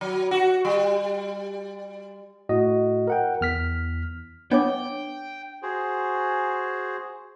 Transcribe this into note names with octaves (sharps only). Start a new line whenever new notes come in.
F#3
F#4
G3
A2 F#4 D#5
A#4 F#5 G5
E2 F6 B6
B3 D4 C#5 G5 D6
F#4 G#4 C5